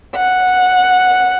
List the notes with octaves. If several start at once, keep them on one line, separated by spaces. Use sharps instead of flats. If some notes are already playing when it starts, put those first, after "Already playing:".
F#5